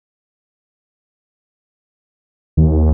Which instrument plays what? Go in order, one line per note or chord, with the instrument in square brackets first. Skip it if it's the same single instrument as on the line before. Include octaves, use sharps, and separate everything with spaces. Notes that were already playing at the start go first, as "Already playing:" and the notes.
[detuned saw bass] D#2